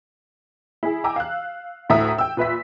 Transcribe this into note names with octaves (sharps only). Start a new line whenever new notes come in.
E4 G#4
G5 G#5 A#5 D6 E6
F5 F#6
D2 A2 E5 A#5 D#6
G5 E6
A#2 B4 E5 B6